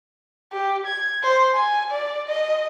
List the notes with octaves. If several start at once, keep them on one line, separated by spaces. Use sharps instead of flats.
G4
G#6
C5
G#5
D5
D#5